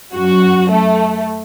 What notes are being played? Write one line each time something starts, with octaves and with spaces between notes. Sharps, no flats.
F#2 F#4
A3